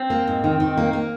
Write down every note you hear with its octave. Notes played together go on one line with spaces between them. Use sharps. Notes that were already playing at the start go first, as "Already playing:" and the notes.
Already playing: C4
A#3
G#2
D#3
D#3
A#3
A#3